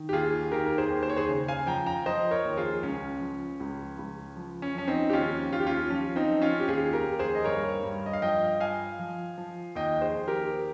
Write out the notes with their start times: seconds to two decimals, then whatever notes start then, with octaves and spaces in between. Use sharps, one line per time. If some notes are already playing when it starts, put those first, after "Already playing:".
Already playing: D#3
0.09 G4
0.13 D#2 F4 G#4
0.51 D#3 G4 A#4
0.66 A#4
0.78 G#4 C5
0.90 D#2
1.03 C5
1.09 C#5
1.16 G#4 C5
1.28 C#3
1.48 F5 G#5
1.67 F3 G5 A#5
1.86 G5 A#5
2.06 F3 C5 D#5
2.31 A#4 C#5
2.44 D#2
2.57 F4 G#4
2.83 C#2 C#4
3.21 F3
3.60 C#2
3.99 C#2
4.37 F3
4.62 C#4
4.75 F3 C#4
4.88 C4 D#4
5.10 G4
5.13 D#2 C#4 F4
5.52 D#2 F4
5.60 G4
5.66 C#4 F4
5.90 F3 C#4
6.16 C4 D#4
6.29 F3
6.42 C#4 F4
6.60 G4
6.68 D#2 F4 G#4
6.93 G4 A#4
7.07 D#2
7.19 G#4 C5
7.35 D#5
7.44 G2 A#4 C#5
7.83 G2
8.06 D#5
8.13 F5
8.22 F3 D#5 G5
8.60 F3 F5 G#5
8.99 F3
9.38 F3
9.75 D#2 D#5 G5
10.01 G#4 C5
10.15 D#2
10.28 G4 A#4